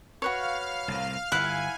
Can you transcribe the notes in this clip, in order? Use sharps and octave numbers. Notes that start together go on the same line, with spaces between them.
F#4 B4 C#5 F5 F6
C2 A2
G1 E4 F5 F#5 G#5